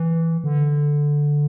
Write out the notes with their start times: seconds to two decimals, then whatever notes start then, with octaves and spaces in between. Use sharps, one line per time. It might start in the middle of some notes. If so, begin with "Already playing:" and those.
Already playing: E3
0.44 D3